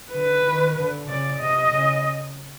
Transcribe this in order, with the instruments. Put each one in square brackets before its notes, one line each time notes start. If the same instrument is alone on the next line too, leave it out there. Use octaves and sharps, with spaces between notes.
[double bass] D3 [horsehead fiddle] B4
[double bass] D#3
D3
[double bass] C#3 [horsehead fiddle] D5
[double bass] C3 [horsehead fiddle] D#5
[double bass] C#3